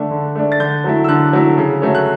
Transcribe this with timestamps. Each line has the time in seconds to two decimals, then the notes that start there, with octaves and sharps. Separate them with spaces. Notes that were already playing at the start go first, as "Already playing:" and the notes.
Already playing: D3 A3 D4
0.11 D3
0.35 A3 D4
0.52 A6
0.60 D3 G6
0.84 F#3 A3 E4
1.04 E6
1.09 D3 F#6
1.33 F#3 A3 E4
1.58 C#3
1.82 F#3 A3 C#4
1.95 F#6